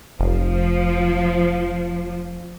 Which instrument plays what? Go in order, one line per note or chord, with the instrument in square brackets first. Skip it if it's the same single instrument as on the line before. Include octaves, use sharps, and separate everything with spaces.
[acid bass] F1 [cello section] F3